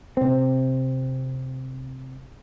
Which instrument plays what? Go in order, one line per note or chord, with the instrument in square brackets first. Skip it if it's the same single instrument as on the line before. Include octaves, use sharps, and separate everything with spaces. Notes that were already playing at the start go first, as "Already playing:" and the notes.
[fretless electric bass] C3 C4